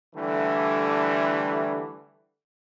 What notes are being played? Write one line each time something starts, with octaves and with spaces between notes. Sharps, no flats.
D3 E3 G3 A3